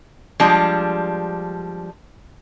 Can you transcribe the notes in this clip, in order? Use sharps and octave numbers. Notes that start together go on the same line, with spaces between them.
F3 G3 G#3 D4